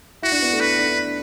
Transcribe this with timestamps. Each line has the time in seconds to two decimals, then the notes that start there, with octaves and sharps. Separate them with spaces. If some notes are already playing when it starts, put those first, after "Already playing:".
0.22 E4 F#4
0.32 D4
0.42 B3
0.51 A3
0.60 B4
0.79 D4